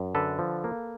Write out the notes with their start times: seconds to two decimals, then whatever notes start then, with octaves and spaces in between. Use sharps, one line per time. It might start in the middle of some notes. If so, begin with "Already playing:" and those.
Already playing: F#2
0.15 D3 A4 B4
0.39 F3
0.64 A#3